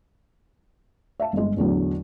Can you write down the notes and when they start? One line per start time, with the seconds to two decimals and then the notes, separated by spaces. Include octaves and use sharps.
1.20 E5 F5 A5
1.33 G1 G#3
1.57 A1 E2 D3 F#3